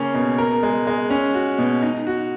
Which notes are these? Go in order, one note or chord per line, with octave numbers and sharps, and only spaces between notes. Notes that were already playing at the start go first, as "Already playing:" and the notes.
Already playing: C#3 A#3 C#4
B2
A#4
G#3
G#3
C#4
F#4
B2
D#4
F#4